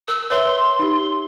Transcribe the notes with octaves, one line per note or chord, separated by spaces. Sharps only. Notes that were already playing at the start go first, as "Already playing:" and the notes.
A#4 E6
B4 C#5 E5 C6
D#4 G4